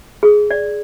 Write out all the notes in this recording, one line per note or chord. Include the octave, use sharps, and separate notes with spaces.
G#4
D5